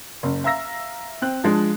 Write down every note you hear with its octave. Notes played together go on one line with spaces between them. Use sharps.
F#1
E5 F5 A#5 E6 A#6
C4 F#6
F3 G#3 D4